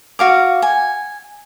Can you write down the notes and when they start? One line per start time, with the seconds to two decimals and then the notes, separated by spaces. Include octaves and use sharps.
0.19 F#4 F5 D6
0.62 G#5